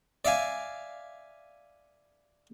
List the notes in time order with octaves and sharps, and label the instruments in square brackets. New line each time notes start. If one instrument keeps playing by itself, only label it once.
[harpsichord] D5 E5 F5 G#5